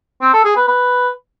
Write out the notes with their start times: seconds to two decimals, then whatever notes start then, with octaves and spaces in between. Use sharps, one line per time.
0.22 C4
0.33 A4
0.45 G#4
0.56 B4
0.68 B4